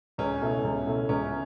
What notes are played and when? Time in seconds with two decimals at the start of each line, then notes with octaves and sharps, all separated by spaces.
0.18 C#2 C#4
0.41 B2 A3 E4
0.64 C#2
0.87 B2 A3 E4
1.09 C#2 C#4